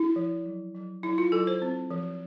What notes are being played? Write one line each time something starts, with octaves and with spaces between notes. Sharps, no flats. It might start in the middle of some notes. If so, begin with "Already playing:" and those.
Already playing: E4
F3
F#3
F#3
F#3 E4
F4
F#3 A4
C5
C4
F3